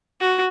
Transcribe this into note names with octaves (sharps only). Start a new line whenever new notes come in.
F#4